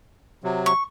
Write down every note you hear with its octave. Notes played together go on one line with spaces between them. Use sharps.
C3 F#3
C#6